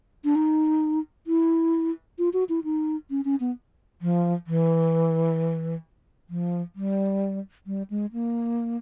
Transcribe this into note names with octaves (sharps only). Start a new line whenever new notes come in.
D4
D#4
E4
F4
F#4
E4
D#4
C#4
C#4
B3
F3
E3
F3
G3
G3
G#3
A#3